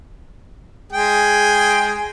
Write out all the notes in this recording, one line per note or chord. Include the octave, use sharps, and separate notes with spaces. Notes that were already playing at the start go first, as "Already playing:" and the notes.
G#3 G#4 G5